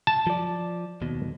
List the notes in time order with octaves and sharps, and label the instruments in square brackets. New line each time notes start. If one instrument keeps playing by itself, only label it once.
[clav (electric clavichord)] A5
[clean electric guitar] F3 D5
D#2 B2